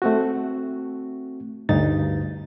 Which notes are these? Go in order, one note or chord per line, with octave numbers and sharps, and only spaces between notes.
A3 C4 F#4
D2 G2 D#4 A6